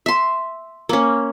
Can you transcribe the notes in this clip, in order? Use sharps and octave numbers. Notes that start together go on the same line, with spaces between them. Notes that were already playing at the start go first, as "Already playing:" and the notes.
E5 C6
A#3 C#4